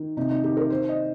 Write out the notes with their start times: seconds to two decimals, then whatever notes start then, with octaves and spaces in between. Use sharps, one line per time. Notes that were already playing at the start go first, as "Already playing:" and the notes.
Already playing: D#3
0.17 C3 D#4
0.31 D#4
0.44 D#3 G4
0.57 A#4
0.70 D#3 C5
0.89 D#5